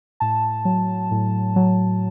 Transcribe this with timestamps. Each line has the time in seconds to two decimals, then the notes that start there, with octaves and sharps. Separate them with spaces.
0.20 A2 A5
0.65 F#3
1.11 A2
1.56 F#3